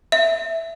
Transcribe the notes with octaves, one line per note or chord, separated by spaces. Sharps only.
E5